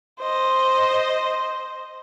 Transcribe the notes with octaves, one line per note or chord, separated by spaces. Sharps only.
C5 D#5